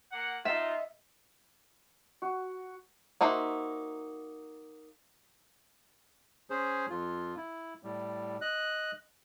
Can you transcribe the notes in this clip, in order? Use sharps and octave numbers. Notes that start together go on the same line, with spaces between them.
A#3 F#5
D#4 F4 D#5 E5
F#4
A#3 D#4 F#4 C5 E5
C#4 G#4 C5
F2 F4
E4
A2 G3
D#5 F#6